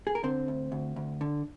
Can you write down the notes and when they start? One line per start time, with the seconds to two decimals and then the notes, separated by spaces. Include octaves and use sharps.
0.07 G#4
0.15 A#4
0.23 D3 C4 C5
0.48 D2
0.72 D2
0.96 D2
1.21 D3